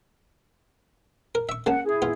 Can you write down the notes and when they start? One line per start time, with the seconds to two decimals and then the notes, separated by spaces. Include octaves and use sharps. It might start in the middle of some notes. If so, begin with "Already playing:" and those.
1.35 A#4
1.49 E5 C#6
1.66 C#3 A#3 F#5 A5
1.86 E4 G#4
2.02 B3 F4